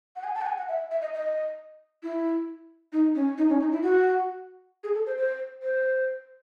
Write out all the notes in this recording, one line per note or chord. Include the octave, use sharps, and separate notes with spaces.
F#5
G#5
A5
F#5
G#5
F#5
E5
E5
D#5
D#5
E4
D#4
C#4
D#4
C#4
D#4
E4
F#4
G#4
A4
C5
C5
C5